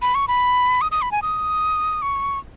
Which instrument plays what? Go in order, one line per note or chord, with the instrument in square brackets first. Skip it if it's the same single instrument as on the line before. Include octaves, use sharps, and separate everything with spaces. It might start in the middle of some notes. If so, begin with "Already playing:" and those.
[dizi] B5
C#6
B5
D#6
D#6
B5
G#5
D#6
C#6